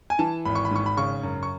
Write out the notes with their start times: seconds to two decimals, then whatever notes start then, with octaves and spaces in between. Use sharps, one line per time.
0.10 G#5
0.19 E3 A5
0.45 G#1 B5
0.55 C#6
0.65 B5
0.71 G#2 C#6
0.86 B5
0.97 C#3 C#6
1.23 F#2
1.43 C#6